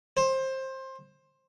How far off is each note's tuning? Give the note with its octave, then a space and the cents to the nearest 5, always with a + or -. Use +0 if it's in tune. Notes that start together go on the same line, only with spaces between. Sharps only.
C5 +20